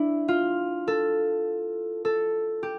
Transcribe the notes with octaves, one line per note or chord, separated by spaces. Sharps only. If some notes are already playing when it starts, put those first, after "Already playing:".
Already playing: D4 E4
F4
A4
A4
G4